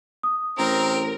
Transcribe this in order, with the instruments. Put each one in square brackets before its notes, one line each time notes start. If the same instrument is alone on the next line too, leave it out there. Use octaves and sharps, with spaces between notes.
[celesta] D#6
[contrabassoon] A1 [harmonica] C4 [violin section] A#4